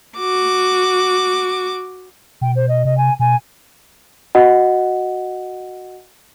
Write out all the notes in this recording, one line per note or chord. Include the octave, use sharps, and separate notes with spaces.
F#4 D6
B2 G5
C5
D#5
C3 D#5
G#5
B2 G#5
F#4 D#5 F#5